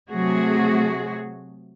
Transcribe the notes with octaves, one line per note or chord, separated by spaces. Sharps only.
C3 F#3 A3 F#4 G#4